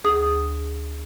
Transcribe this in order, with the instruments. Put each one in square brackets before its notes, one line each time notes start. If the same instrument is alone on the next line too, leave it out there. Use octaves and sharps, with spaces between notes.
[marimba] D2 G#4 D#6